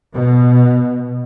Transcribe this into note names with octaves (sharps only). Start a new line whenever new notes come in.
B2